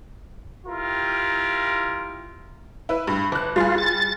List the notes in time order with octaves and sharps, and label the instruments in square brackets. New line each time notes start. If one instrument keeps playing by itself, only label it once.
[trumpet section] E4 F4 G4 A#4
[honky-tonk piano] E4 B4
G2
G1 F#6
[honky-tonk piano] G3 G#4 [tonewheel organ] F4
[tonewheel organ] A6